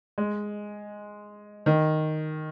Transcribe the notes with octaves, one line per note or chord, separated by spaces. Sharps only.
G#3
D#3